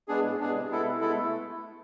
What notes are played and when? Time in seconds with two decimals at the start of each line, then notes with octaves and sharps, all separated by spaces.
0.08 G#3 B3 D4 G#4
0.23 A2
0.39 G#3 B3 D4 G#4
0.54 C3
0.70 G#3 B3 E4 A4
0.84 C3
1.00 G#3 B3 E4 A4
1.15 A3